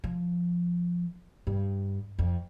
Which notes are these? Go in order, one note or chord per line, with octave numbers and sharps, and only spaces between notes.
F3
G2
F2